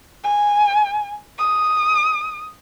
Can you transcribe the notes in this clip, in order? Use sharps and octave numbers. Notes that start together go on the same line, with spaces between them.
G#5
D#6